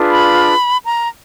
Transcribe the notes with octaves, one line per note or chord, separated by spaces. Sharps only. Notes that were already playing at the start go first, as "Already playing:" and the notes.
Already playing: D4 F4 G#4 B4
B5
A#5